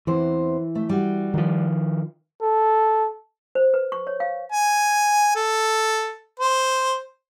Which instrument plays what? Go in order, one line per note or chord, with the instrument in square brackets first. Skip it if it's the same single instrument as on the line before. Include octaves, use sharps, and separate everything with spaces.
[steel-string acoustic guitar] E2 C4 C5 [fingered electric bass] E3
[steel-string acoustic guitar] A3 E5
G3 F#4
[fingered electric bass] D#3 F3
[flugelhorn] A4
[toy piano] C5
B4
C#6
C#5
F5
[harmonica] G#5
A4
C5